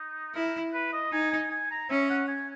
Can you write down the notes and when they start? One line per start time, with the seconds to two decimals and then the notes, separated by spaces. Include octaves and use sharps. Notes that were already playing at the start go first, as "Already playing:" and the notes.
Already playing: D#4
0.35 E4 A#4
0.73 B4
0.92 D#5
1.12 D#4 G#5
1.31 G#5
1.51 G#5
1.71 A#5
1.89 C#4 E5
2.10 F#5
2.28 G#5